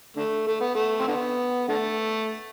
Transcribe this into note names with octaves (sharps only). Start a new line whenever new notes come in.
D3 A3
A3
B3
A3
C4
D3 B3
D3 A3